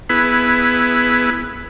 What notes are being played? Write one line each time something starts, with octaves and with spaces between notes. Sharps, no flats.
B3 E4 G#4 B4